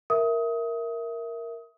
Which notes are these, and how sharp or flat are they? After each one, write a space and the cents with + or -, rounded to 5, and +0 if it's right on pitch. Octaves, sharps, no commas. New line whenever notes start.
A#4 +0 E5 +0 D#6 +25